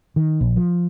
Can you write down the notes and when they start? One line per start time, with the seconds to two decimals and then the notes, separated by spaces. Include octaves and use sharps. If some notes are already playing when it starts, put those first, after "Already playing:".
0.16 D#3
0.41 A#1
0.56 F3